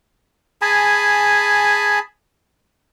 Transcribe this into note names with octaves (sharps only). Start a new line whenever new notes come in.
G#4 G#5 A5 B5